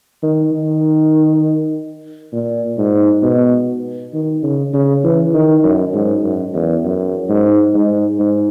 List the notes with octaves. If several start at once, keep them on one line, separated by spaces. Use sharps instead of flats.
D#3
D#3
A#2
G#2
B2
D#3
C#3
C#3
E3
D#3
F#2
G#2
F#2
E2
F#2
G#2
G#2
G#2